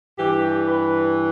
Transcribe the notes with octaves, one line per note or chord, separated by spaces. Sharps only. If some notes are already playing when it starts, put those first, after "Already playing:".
G2 E3 G4
B4